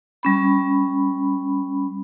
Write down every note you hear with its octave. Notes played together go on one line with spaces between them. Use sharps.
G3 C#4 B5